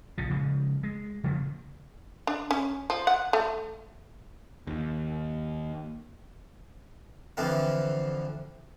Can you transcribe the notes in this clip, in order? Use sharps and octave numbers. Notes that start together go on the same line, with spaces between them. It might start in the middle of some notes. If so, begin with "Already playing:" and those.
A#1 C#3 F3
C#3 F3 G#3
G#3
C#3 F3 G3 A#3
D4
C#4
F3
F#5
A3
D#2
F2 D3 E3 F3 C4 F4